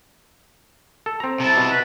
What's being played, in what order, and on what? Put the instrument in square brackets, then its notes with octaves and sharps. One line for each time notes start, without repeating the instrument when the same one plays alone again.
[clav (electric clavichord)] A4
C4 A#5
[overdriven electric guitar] C3 E4 [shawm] A5
[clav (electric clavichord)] B2
[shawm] B4